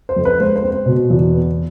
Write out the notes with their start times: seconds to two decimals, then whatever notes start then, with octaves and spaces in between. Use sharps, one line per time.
0.09 C5
0.16 F2
0.25 B4
0.40 G#3 C5
0.56 C5
0.63 C4
0.71 C5
0.86 B2
1.10 E2
1.33 B3